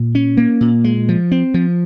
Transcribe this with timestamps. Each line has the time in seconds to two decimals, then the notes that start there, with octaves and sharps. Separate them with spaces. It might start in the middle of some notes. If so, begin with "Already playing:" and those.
Already playing: A#2
0.15 C#4
0.37 A#3
0.61 A#2
0.84 G#3
1.09 F3
1.32 C4
1.54 F3